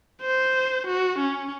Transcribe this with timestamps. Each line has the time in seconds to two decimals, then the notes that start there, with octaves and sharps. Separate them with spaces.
0.22 C5
0.87 F#4
1.19 C#4